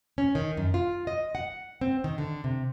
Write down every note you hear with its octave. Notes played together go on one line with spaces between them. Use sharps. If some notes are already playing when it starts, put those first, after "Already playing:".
C#4
D#3
F#2
F4
D#5
F#5
C4
D#3
D3
C3